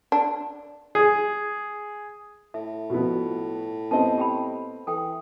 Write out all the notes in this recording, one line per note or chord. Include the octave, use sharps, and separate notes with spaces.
D4
G#4
A2 E5
B2 F3 B3
B3 C4 D#5 A5
G4 G5 B5
E3 A4 G5